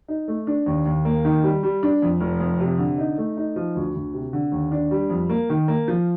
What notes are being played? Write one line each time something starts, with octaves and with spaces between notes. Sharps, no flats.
D#4
A3
D4
D#2
D#2
A#3
D#3
G3
G3
D4
F2
F1
F2
C3
D3
D#4
A3
D#4
F3
D2
D2
C3
D3
D#2
D4
G3
F2
A#3
D#3
A#3
F3